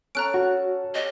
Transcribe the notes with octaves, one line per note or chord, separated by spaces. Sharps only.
C#4 A4 F#5 A#5 F#6 D7
F#4
G4 C#5 D#5 F#5